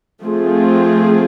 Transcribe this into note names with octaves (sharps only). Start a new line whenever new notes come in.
F3 A3 C4 F4 G#4